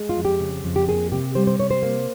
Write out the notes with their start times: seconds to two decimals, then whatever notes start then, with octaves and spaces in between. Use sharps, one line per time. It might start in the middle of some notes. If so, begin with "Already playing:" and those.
Already playing: G#3
0.09 F4
0.17 F2
0.25 G4
0.40 C#3
0.64 F2
0.76 G4
0.88 A#3 G#4
1.12 C3 G4
1.35 G3 C5
1.47 C5
1.59 C3 C#5
1.71 C5
1.83 A#3